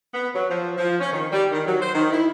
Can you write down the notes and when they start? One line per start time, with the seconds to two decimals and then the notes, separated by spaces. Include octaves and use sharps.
0.14 B3
0.35 F#3
0.50 F3
0.77 F3
1.00 C#4
1.13 D#3
1.33 G3
1.51 D#3
1.67 F#3
1.81 C5
1.95 D#3
2.12 E4